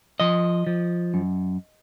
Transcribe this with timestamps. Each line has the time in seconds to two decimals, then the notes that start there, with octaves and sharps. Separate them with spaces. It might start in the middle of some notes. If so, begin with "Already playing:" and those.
0.20 F3 D#5
0.67 F3
1.14 F#2